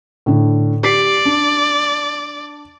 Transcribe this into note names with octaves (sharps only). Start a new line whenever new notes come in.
A2 D3
G4 D5 B6 C7
D4